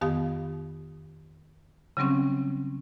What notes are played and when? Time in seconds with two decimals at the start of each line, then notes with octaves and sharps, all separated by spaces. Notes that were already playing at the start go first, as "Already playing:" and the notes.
0.01 F2 D#3 B3 G4 F5 D#6
1.97 C#3 F#3 G3 C4 C#4